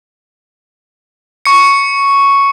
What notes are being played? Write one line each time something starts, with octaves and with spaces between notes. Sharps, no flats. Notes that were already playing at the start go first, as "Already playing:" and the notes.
C#6 C#7